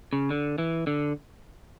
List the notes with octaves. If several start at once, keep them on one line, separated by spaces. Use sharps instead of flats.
C#3
D3
E3
D3